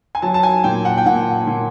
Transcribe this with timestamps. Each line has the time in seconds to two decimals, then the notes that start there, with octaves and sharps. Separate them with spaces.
0.15 G#5
0.22 F#3 A5
0.34 A5
0.43 G#5
0.64 A#2 G5
0.85 F#5
0.97 G5
1.06 A#2 F#5
1.47 A#2